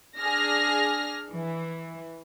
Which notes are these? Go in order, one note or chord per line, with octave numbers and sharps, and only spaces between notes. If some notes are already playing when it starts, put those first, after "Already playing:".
D4 G#4 F6 A#6
E3